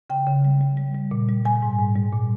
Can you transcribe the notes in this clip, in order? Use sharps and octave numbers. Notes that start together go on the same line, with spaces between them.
C#3 G5
C#3
G3
G3
G3
G3
A#2
G3
G3 G#5
G#2
G#2
G3
A#2